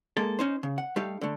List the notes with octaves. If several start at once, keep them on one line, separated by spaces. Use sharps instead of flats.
G#3 A#3 A4
C#4 D#4 C5
C#3
F#5
G3 A3 D#4 G4 F5
D3 A3